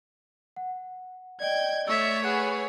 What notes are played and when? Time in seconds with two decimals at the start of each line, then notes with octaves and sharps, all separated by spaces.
0.56 F#5
1.40 D5 D#5 G5 G#6
1.87 A3 C#5 D5 E5 E6
2.24 G#4 B4 F#5 F#6 E7